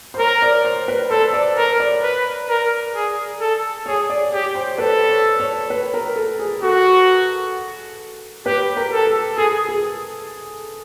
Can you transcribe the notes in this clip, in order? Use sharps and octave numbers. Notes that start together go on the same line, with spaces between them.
C5
A#4 C#5
D5
C5
B4
A4 C5
D5
A#4 C#5
D5
B4
A#4
G#4
A4
G#4 C#5
D5
G4 C#5
C5
A4 B4
C#5
C#5
B4
A#4
A4
G#4
F#4 A4
G4 B4
A#4
A4
A4
G#4 A4
G#4